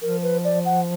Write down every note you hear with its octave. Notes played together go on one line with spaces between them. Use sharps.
F3 A#4
B4
D5
F#5